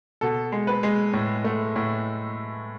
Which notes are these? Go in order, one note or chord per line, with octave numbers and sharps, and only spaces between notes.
B2 A4
G#3
B4
G#3
A2
A3
A2